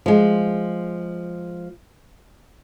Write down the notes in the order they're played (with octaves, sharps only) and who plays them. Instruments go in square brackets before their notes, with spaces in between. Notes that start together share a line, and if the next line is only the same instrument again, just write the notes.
[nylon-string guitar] F3 G#3